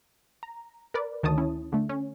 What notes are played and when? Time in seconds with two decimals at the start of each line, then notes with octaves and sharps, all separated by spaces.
0.43 A#5
0.94 A#4 B4 D5
1.23 D2 D#3 C#5 A5 D#6
1.38 C#4 E4
1.72 D3 A3
1.89 C#4